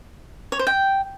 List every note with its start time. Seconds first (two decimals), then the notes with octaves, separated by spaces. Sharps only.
0.52 C#5
0.59 C5
0.67 G5